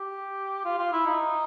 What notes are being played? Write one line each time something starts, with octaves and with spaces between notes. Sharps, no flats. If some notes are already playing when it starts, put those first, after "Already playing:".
Already playing: G4
F4
F4
E4
D#4